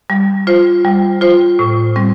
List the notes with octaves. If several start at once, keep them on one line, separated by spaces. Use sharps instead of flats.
G3
F4 C5
G3
F4 C5
A2
G3 C4